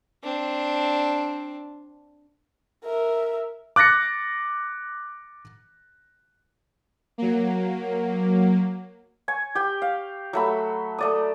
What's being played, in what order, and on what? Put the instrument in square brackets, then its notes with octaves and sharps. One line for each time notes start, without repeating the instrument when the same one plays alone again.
[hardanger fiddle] C4 D4
[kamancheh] A#4 E5
[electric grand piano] D6 F#6 A6 A#6 C#7
[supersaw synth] F#3 A#3
[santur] G#5 C#6
G4 G5
F5
F#3 A3 B5
A3 D5 D#6